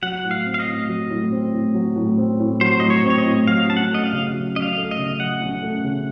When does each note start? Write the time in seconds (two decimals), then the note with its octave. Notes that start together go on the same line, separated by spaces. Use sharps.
0.02 F#3 F#5
0.24 A2
0.31 F5
0.46 C4
0.54 F5
0.60 D#5
0.68 A2
0.89 F#3
1.10 A2
1.32 C4
1.54 A2
1.74 F#3
1.96 A2
2.18 C4
2.40 A2
2.61 F#3 C5
2.80 A2 D#5
2.90 C#5
3.04 C4
3.10 C#5
3.18 D#5
3.26 A2
3.47 F#3 F5
3.69 C#4 A5
3.77 F#5
3.91 A3 D#5
4.05 F5
4.13 C#3
4.34 F#3
4.55 C#4 D#5
4.62 F5
4.77 A3
4.91 D#5
4.98 C#3
5.19 F#3 F#5
5.42 C#4
5.63 A3
5.84 C#3